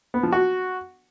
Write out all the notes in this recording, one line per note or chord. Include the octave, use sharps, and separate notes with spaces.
B3
F3
F#4